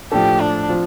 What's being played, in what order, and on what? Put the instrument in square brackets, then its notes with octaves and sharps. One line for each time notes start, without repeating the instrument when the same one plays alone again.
[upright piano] A2 F3 D4 A4 [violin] G4
[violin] D4
[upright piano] F3 C4 F4